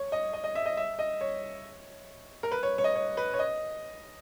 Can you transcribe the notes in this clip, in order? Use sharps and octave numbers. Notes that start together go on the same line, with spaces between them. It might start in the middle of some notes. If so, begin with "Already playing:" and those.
Already playing: C#5
D#5
D#5
D#5
E5
D#5
E5
D#5
C#5
A#4
B4
C#5
C#5
D#5
C#5
B4
C#5
D#5